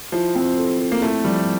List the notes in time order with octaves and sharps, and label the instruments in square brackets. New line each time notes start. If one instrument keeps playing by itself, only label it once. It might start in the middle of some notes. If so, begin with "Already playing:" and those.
[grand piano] F3 [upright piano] E4
[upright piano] C4
A4
A4
[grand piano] A#3
[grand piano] A3 [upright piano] E4
[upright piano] F3 [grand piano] G3